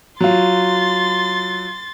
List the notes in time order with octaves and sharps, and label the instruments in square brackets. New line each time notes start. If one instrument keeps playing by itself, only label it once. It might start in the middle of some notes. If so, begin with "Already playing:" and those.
[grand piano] F#3 F4 [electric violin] C6 A6